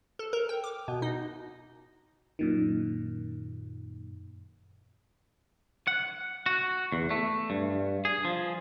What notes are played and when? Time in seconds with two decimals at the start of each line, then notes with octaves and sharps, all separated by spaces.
0.19 A4
0.33 A#4
0.49 G5
0.64 D6
0.88 B2
1.02 D#4
2.39 F#2 A#2 D#3
5.87 F#5
6.46 F#4
6.92 E2
7.11 A3
7.50 G2
8.05 G#4
8.25 F3